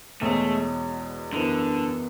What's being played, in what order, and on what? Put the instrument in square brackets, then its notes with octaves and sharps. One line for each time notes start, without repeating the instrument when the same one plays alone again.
[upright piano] E2 B2 G#3 C#4 G#4 [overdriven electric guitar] A3
[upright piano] F#2 E3 B3 [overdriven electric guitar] D3